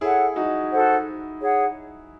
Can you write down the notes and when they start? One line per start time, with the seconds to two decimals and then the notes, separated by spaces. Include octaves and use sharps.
0.01 E4 G#4 A4 C#5 F#5
0.36 D#4 F#4
0.72 F#4 A4 C5 F#5
1.41 G#4 C#5 F#5